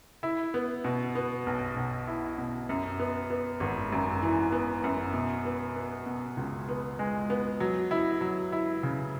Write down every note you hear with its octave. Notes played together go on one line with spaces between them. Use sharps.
E4
B3
B2
B3
B1
B1
E4
B2
F#2
B3
B3
G#1
F#2
E3
B3
F#2
B2
B3
B3
B2
C#2
B3
G#3
B3
F#3
E4
F#3
E4
C#3